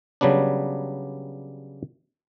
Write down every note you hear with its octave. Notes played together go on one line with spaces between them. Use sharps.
C#3 F#3 G3 B3 D4